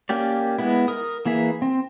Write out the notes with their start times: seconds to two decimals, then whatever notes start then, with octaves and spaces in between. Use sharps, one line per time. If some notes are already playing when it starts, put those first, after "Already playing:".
0.09 A#3 C#4 G4 D5
0.59 G#3 B3 E4
0.88 A#4 D#6
1.26 E3 A#3 G#4 E5
1.62 C4